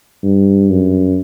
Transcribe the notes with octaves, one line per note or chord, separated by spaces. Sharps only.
G2
F#2